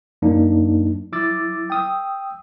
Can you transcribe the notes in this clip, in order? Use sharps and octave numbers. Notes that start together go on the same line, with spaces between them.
F#2 F#3 A#3 D4 D#4
F#3 E4 D6 E6 A6
G5 D#6 E6